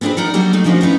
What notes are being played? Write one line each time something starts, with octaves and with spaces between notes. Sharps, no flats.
B3 C4 D4 F4 G#4 B4
D#4 A#4 D5 F#5
F#3 G3 A#3 D4 G4 D#5
F#3 A3 D#4
D#3 F3 C#4 D4 F#4 C5
B3 C#4 D#4 E4